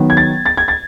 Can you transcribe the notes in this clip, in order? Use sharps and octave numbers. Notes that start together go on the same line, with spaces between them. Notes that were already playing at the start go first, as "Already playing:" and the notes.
Already playing: D#3 F#3 B3
G#6
A6
A6
G#6
A6